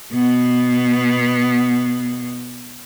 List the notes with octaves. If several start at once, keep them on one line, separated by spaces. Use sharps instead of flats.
B2 B3